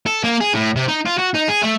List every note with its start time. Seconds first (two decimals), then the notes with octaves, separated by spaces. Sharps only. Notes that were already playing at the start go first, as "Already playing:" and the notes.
0.06 A4
0.24 A#3
0.40 G#4
0.53 A2
0.76 C3
0.88 D#4
1.06 F4
1.19 F#4
1.35 D#4
1.49 G#4
1.62 A3